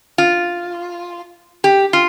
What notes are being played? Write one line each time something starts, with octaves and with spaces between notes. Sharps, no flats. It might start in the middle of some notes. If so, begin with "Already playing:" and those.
F4
G4
F4